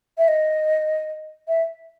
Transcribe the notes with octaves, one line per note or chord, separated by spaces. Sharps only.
E5
D#5
E5